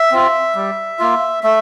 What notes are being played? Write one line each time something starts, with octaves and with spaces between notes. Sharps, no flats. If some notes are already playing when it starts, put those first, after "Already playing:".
Already playing: E5
C4 F4
G3
A#3 F4
A3 E5